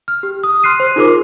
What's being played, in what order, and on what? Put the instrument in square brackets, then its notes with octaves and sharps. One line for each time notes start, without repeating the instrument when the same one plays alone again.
[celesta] F6
G4
D#6
C6 F6 F#6 C7 D#7
C5
D#4 F4 G#4 A#4 C5 D6